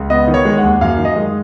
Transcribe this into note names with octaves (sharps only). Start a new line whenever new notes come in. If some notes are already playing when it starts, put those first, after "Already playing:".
Already playing: C#2
B3 D#5
D#3
C#5
G#3
F#5
D#2
F#2 F5
D#3
D#5
G#3